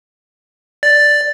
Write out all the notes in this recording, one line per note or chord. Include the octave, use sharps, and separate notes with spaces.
D5 A6